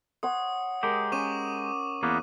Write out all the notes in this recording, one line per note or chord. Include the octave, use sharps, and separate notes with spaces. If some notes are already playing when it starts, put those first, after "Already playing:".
C#5 F#5 C6 D#6
G#3 G4 A#4
C#4 C#6 D6 D#7
E2 A#3 B3